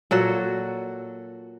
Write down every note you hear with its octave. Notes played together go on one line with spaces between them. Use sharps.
A#2 F#3 F#4 A4